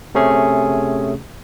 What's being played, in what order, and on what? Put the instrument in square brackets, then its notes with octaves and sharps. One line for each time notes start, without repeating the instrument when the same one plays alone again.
[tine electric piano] C3 A3 C#4 G#4